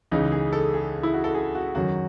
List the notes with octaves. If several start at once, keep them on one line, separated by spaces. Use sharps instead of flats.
C#2 C#3 E3 D#4
G#4
A4
G#4
E4
F#4
A4
G#4
F#4
F#2 D#3 F#3 F#4